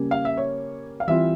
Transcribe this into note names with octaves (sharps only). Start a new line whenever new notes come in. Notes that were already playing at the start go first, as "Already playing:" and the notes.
Already playing: C#3 G3 A#3 C#4
F5
E5
C#5
F5
E3 G3 C4 F4 E5